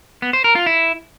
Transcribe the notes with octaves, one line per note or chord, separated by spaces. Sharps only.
B3
C5
A#4
F4
E4